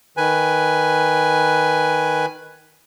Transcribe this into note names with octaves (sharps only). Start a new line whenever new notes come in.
D#3 B4 G#5